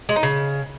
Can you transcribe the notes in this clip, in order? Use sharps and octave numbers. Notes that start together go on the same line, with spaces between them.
G#3
D#4
C#3